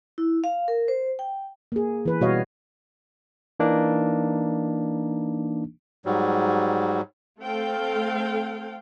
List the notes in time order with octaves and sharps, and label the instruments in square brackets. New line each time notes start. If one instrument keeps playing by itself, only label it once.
[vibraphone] E4
F5
A#4
C5
G5
[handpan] A#3 G#4
E3 B4
B2 G3 F#4 C#5 D#5 F5
[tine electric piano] E3 A#3 D4 D#4
[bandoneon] G#2 F#3 G3
[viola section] A3 C4 A4 F5 G5